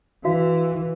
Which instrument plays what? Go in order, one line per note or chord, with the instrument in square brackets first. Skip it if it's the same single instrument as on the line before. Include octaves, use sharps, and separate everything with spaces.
[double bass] E3 [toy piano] F#4 E5 F5